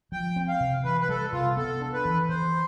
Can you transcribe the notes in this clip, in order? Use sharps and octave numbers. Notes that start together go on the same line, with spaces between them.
F3 G5
C4
F5
C3
E3 B4
B4
G3 A4
C3 F4
B3 A4
D4
B4
E3
E3 C5